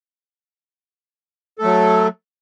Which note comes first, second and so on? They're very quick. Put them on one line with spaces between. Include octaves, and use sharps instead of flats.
A4 A3 F#3